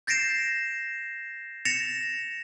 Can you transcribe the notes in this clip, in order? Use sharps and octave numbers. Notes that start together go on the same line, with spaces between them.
G6 A6 A#6 C7 D7 E7
A6 A#6 C#7 E7 F7